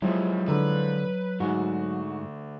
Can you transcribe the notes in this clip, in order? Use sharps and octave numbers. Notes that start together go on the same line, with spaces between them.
G#2 C3 F3 F#3 G#3 E4
D3 B4 A#5
D2 G#2 F#4